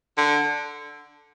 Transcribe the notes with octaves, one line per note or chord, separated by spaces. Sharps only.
D3